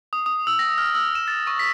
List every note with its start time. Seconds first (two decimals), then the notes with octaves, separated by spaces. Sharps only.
0.13 D#6
0.26 D#6
0.47 E6
0.59 A#6
0.78 F6
0.94 E6
1.15 E7
1.28 A6
1.47 C#6
1.59 B6